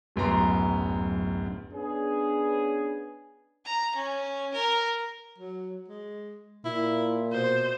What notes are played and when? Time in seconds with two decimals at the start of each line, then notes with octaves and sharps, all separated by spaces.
0.16 D1 F#2 B3 A#5 C6
1.72 B3 C#4 D4 G#4
3.65 A#5
3.96 C#4
4.54 A#4
5.38 F#3
5.88 G#3
6.65 A#2 E4
7.33 B2 C5